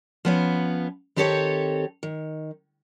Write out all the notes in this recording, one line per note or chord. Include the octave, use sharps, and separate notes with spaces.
F3 B3 C#4
D#3 C4 G4 A4 C5 C#5
D#3